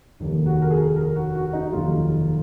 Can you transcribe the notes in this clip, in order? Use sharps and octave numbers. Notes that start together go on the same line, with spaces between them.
F1 D#2 D#3
F#4
A#4
G#4
A#4
F#4
F#4
D#4
F1 D#2 D#3 F#3 F4